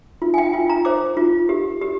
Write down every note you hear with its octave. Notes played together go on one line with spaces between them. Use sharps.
F4
G#5
G5
F4
A#5
C5 D6
F4
G4
G4